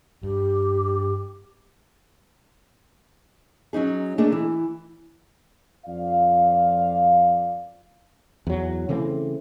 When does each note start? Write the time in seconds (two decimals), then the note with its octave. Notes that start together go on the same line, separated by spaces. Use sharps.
0.23 G2 G4
3.73 F#3 C#4 D#4 G#4
4.18 A3 A#3 D4 G#4 D#5
4.32 E3 E4
5.86 F2 F4 D5 F5
8.47 E2 F#3
8.89 C#3 E3 A3 C4